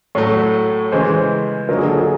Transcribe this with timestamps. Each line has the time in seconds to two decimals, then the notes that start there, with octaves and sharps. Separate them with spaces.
0.15 A2 F#3 A3 C#5
0.92 C#3 E3 G#3 C5
1.69 D3 F#3 A#3 D#4 A#4
1.78 G#4
1.88 A4
1.97 G#4